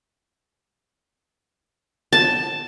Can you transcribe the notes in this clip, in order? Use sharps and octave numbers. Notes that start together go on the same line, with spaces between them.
A5